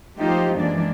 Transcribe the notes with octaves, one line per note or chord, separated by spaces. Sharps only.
F3 A3 D#4 F4 G4 C5
F#2 E3 G#3 A#3 D4 D5